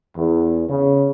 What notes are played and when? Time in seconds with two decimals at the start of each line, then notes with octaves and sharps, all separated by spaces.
0.17 E2
0.69 C#3